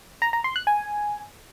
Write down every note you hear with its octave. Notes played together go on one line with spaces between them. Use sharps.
A#5
A#5
C6
F#6
G#5